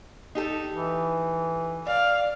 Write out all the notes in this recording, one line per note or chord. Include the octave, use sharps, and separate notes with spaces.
D#4 G4 A4
E3
D5 F5